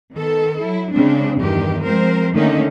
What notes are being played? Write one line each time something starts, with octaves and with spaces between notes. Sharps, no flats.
D#3 B3 A4
F#3 E4
C#3 G#3 C4 D4
E2 G2 D#3 G4
F3 G#3 C4 A#4 C5
D3 D#3 A3 A#3 C#4 D#4